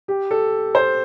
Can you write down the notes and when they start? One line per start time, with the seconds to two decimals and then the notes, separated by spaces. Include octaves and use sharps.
0.08 G4
0.31 A4
0.75 C5